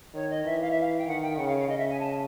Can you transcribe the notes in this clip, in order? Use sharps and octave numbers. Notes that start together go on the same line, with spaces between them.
D#3 C#5
D#5
E3 E5
F5
E5
F5
G5
D#3 F#5
G5
C#3 F#5
F5
F5
C#3 D#5
E5
G#5
A5